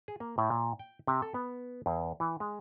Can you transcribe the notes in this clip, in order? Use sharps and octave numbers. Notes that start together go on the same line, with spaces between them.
G#4
A#3
A2
A#2
G5
C3
A4
B3
E2
E3
G#3